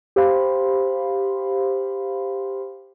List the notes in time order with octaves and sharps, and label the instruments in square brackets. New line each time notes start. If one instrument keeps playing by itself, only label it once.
[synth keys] G4 C5 F5 B5 C6